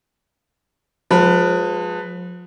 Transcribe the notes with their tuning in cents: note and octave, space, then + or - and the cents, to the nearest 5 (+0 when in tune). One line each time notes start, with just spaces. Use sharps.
F3 +35 G#3 +0 B4 +0